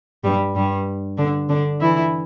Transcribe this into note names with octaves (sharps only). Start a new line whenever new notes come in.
G2 G3
G2 G3
D3 D4
D3 D4
E3 E4